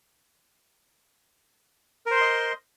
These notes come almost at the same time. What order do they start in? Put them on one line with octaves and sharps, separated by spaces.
A#4 C5 C6 D#5